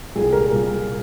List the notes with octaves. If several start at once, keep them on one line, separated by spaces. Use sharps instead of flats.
C2 A#2 G3 G#4
A#4
A#2 G3